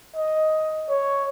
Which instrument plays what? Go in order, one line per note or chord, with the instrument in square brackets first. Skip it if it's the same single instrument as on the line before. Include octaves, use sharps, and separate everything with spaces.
[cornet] D#5
C#5